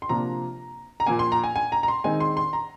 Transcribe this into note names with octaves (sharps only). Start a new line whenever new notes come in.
C6
C3 F3 A#3 D4 F4 A#5
A#5
A#2 F3 A#3 G#5
C6
A#5
G#5
G#5
A#5
A#5
C6
D#3 G#3 C4 D#4 G#5
C6
C6
A#5